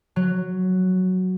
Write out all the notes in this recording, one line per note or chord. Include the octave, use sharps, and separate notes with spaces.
F#3